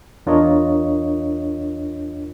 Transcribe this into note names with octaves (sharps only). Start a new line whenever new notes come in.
E2 D4 F4 A#4 C#5 D#5